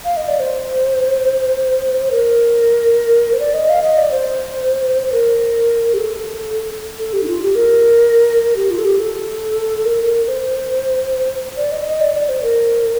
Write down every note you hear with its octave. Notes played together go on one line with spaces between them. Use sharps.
F5
D#5
D5
C5
A#4
C5
D5
D#5
F5
D#5
D5
C5
C5
A#4
G4
A4
A4
G4
D#4
F4
G4
A#4
G4
F4
A4
G4
A4
A#4
C5
D5
D#5
D#5
D5
D5
C5
A#4